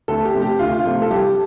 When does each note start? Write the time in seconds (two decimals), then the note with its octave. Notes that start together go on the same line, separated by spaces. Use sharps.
0.08 D2 A4
0.25 G4
0.34 C3 A3 C4
0.42 G4
0.59 D2 F4
0.79 F4
0.85 C3 A3 C4
1.02 A4
1.11 C2 G4